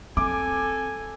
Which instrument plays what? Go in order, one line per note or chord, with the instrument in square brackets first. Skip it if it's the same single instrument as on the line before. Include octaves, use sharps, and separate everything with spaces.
[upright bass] C4 [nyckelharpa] A4 G#5 [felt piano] D6